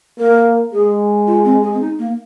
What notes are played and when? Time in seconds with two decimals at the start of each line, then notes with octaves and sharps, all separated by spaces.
0.19 A#3 A#4
0.73 G#3 G#4
1.27 F4
1.45 C4
1.63 G#4
1.74 C4
1.81 D#4
1.99 A#3